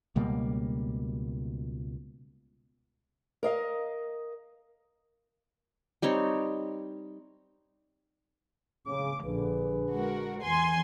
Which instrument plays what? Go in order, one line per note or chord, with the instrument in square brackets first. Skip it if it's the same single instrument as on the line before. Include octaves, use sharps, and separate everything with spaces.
[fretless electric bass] C#2 B2 G3 A#3
[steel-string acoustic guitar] A#4 D#5 F5
[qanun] G3 C4 D#4 C#5
[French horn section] C#3 [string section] D6
[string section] A#1 [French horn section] D3 G#4 B4
[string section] G#3 F#4 A#4
E2 G#5 C6